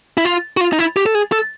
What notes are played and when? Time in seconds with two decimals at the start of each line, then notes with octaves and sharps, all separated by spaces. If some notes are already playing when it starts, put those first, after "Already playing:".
0.17 E4
0.25 F4
0.57 F#4
0.61 F4
0.73 D#4
0.79 E4
0.97 G4
1.06 A4
1.15 G#4
1.32 A4